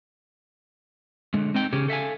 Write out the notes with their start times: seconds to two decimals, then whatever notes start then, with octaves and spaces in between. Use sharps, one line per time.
1.34 D3 G#3
1.54 C4 D#4 G5
1.73 C#3 C#4 G4 G#4
1.88 A4 E5 F5 G#5